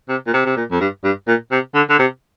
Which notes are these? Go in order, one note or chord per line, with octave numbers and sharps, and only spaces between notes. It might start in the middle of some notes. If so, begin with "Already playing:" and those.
C3
A#2
C3
C3
A#2
F2
G2
G2
A#2
C3
D3
D3
C3